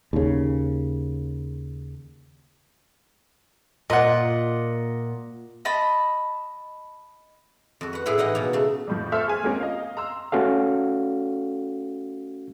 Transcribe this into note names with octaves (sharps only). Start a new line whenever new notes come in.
D#2 C#3
A#2 D#5 F#5
D#5 A5 B5
F2 F#4
B4 F#5
A2 E4 G#4 F#5 B5
E3 D#4 D#5 F#5
B2 A#3
C#3 A3
F2 A2 F3
A4 C5 E5 C6 C#6 F6
G#4 G#5 F6
G#3 A#3 C4 C#4 F4 A#4
D#5 F5
A#5 C6 E6
A3 C#4 F#4 A4 F5